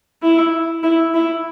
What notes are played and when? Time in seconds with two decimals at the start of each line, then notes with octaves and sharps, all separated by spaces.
0.23 E4
0.83 E4
1.14 E4